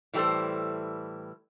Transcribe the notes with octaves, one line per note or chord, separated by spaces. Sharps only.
A2 E3 G3 B3 A4 C5